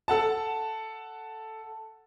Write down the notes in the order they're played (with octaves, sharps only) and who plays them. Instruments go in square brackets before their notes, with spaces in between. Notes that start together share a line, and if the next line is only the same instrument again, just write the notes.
[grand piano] A4 F#5 A5